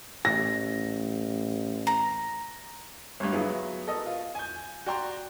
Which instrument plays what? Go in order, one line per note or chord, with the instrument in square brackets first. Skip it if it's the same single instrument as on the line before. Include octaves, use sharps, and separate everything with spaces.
[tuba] A1 [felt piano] A#6
[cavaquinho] A#5
[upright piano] G1 G2
F#3 B3 E4 F4 G#4
F#4 A4 A#4 D#5
F4
G#5 G6
F#4 D5 G5 A#5 C6